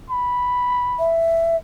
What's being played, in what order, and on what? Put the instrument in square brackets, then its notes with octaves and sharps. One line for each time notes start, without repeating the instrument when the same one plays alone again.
[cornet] B5
[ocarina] E5